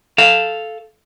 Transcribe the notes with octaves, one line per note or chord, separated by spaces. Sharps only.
A4 F5